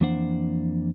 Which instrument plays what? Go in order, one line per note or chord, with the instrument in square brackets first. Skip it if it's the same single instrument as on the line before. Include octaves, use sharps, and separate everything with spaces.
[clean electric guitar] F2 E3 A#3 D4 C5 F#5